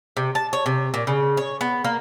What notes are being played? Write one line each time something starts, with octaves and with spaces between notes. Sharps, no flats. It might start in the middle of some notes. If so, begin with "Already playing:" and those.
C3
A5
C#5
C3
A#2
C#3
C#5
B3
A#3